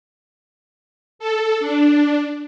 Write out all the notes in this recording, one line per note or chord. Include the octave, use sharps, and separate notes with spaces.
A4
D4